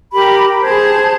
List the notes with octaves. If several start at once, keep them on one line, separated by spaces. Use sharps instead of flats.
G4 A#4 B5
G#4 C5 A5 G#6